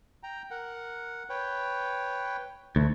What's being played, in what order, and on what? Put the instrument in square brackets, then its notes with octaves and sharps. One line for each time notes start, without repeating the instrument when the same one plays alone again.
[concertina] G5 A#5
A#4 F#5
B4 C#5 G5
[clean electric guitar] D2 [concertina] A3